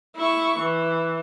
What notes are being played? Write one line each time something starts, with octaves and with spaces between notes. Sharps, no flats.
E4 C#6
E3